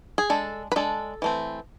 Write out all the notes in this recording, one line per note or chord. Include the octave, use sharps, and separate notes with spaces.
G#4
G#3 D4 A4
B4
G#3 D4 A4
E3 A3 C4